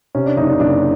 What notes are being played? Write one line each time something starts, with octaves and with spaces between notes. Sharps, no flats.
C3 C#4
D4
F#1 D#4
D4
F#1 D4